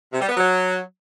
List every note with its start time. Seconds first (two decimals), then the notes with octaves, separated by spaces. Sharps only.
0.13 C3
0.21 G3
0.29 B3
0.37 F#3